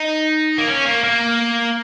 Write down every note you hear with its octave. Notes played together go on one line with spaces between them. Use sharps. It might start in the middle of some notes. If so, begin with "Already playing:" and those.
Already playing: D#4
A#3
C#4
A#3
A#3